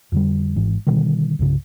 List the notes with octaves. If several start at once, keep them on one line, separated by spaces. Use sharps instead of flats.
F2 D3 G3
G#1 G#2 E3
B2 D3 D#3 G3
C2 G2 C#3